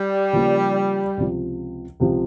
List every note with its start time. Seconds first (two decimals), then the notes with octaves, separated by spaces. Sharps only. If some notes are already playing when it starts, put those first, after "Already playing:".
Already playing: G3
0.33 C#3 F3 A#3
1.17 C#2 C3 F3
2.00 C#2 C3 F3